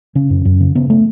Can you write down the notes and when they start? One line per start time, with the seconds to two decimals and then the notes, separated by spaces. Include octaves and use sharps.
0.15 C#3 C#4
0.30 F#2
0.45 F#2
0.60 C#3
0.75 C#3 B3
0.90 A3